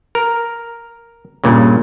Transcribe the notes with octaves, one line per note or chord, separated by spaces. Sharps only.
A#4
G2 A#2 C#3